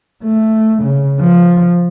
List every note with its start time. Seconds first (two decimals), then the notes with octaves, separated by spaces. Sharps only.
0.24 A3
0.83 C#3
1.20 F3